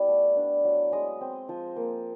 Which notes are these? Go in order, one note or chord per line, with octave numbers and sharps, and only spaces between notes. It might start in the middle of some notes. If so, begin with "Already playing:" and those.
Already playing: G3 B3 E4 D5
A3
D4
F#3
G#3 D#5
C4
F3
A#3